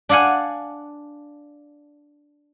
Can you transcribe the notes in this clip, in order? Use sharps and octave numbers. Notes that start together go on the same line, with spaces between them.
D4 D5 F5 F#5 G#5